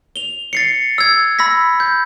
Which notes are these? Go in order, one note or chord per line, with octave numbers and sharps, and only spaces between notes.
F7 G7
A6 C7 C#7
E6 G#6
B5 E6 A#6 B6
G6